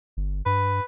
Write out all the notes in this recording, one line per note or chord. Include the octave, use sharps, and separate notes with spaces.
G1
G2 B4